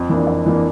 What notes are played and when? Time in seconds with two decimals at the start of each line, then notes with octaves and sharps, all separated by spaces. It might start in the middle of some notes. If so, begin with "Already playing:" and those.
Already playing: F2
0.09 E3 A#3 D4
0.27 F2
0.46 E3 A#3 D4